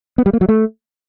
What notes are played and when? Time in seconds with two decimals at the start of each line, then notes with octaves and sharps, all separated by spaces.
0.18 B3
0.26 G3
0.33 A#3
0.41 F#3
0.49 A3